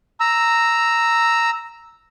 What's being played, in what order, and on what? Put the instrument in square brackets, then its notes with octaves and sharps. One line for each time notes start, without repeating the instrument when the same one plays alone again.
[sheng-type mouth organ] A#5 E6